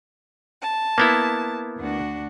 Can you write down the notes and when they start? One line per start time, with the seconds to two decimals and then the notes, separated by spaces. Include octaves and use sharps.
0.61 A5
0.98 A#3 B3 E4
1.78 D2 D4 F#4